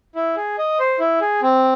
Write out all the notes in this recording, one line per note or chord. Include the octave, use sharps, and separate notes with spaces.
E4
G#4
D#5
C5
E4
G#4
C4